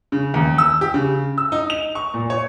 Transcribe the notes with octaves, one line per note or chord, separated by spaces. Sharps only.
C#3
D#2
E6
G4
C#3
E6
D#4
F7
C#6
A#2
C#5